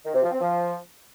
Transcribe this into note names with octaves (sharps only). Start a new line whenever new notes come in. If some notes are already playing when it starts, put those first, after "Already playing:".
D#3
C3
F3
C4
F3